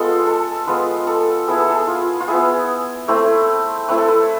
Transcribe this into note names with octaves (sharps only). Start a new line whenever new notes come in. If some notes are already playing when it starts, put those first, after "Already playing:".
Already playing: G#3 B3 F4 A4
A4
G#3 B3 F4 B4
A4
B3 E4 G#4
A4
G#4
F4
F4
B3 E4 G#4
A3 C4 E4
A3 C4 E4 B4
A4
B4